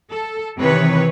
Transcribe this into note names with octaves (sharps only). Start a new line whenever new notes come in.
A4
C3 D#3 E3 B4 C#5